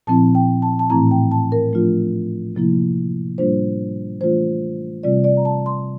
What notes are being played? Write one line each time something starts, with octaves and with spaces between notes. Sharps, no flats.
A#2 F3 C4 E4 A5
G5
A5
A5
A2 E3 A3 C4 E4 A#5
G5
A5
A#4
F3 A3 D4 F4
C3 F3 A#3 E4
A2 G3 A#3 D4 F4 C5
E3 A3 D4 F4 C5
C3 G3 C4 F4 D5
D5
A#5
A5
C6